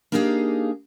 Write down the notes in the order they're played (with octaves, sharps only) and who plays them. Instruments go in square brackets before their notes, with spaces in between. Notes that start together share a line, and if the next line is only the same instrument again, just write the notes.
[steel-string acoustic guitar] A#3 D4 D#4 G4 G#4 F5